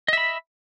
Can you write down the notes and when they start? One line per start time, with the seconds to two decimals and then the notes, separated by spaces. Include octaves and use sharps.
0.08 D#5
0.13 E5
0.18 B5